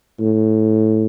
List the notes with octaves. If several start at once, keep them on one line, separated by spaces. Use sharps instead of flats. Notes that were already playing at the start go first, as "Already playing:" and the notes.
A2